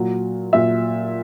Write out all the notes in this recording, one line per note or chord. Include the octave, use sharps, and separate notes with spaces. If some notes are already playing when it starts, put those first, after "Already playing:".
Already playing: A#2 F#3
A#2 F#3 E5